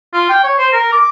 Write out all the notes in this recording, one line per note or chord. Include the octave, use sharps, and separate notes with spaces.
F4
G5
C#5
C5
A#4
D6